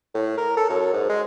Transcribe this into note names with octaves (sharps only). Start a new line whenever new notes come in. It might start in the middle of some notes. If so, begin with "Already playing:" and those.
A2
A#4
A4
F#2
G#2
G#3